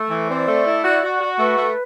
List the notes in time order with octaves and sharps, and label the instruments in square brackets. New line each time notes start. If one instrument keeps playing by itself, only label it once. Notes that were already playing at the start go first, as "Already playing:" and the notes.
Already playing: [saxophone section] A3
E3
[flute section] C5
[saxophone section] C4 [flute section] D5
[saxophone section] A3
E4
F#4
F#4
F#4
[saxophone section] A3 [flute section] B4
[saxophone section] A3